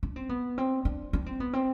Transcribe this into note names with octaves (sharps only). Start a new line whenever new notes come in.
D4
C4
B3
C4
D4
D4
C4
B3
C4